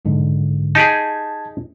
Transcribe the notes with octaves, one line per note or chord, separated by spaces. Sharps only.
B1 G#2 D3
D#4 G4 G#4 A5 G#6